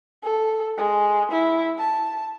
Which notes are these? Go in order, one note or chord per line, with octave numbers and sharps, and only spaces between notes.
A4
G#3
E4
A5